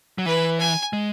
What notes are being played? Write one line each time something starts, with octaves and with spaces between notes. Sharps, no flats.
F#3
E3 B4
G#5
G#3